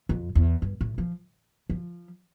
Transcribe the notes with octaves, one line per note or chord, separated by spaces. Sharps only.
F2
E2
G2
A2
F3
F3